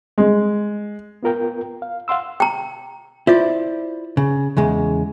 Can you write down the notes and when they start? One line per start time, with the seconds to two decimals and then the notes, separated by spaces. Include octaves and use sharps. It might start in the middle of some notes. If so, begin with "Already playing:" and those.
0.18 G#3
1.23 B3 F4 A#4 G5
1.82 F5
2.08 F5 F#5 C6 E6
2.40 G5 A#5
3.27 E4 F4 C5 D5
4.17 C#3
4.57 E2 C#3 G#3